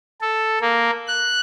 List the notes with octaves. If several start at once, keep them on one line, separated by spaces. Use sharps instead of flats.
A4
A#3
F#6